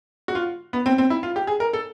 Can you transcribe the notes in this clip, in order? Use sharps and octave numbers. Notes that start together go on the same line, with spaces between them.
F#4
F4
B3
C4
C4
E4
F4
G4
G#4
A#4
A4